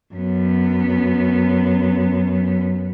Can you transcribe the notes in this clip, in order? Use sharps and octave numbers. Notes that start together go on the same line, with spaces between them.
F#2 B3